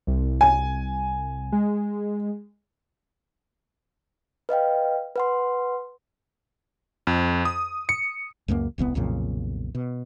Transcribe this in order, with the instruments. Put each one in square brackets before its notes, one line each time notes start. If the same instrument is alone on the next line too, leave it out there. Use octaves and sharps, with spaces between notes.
[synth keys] C2
[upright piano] G#5
[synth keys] G#3
[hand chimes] B4 D#5 F5 G5
B4 F#5 C6
[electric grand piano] F2
D#6
C#7
[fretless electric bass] C#2 F#2 F3 A#3
D#1 C2 A3 B3
B1 F2 A#2 C#3
B2